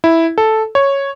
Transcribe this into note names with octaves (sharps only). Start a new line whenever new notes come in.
E4
A4
C#5